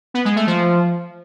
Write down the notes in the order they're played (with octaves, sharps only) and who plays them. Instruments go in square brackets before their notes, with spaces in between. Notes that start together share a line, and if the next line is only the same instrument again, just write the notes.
[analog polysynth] B3
G#3
A3
F3